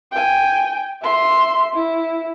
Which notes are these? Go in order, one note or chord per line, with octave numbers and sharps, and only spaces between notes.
G5 G#5
E5 C6
E4